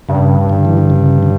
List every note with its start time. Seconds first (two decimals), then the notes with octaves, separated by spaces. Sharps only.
0.09 G2 C#3
0.50 D3
0.65 E3
0.78 D3
0.90 C#3
1.23 D3